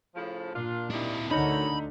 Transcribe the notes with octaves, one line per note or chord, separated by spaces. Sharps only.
A2 C#3 F3
A#2 D4 F4
D#3 G3 D4 E4
D2 D3 D#4 F#4 A#4 C#5 B5